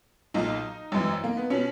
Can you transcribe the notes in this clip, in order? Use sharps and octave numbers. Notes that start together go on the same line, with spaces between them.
B1 A#2 D#4
G#1 F#2 E3
A#3
B3
B2 C#4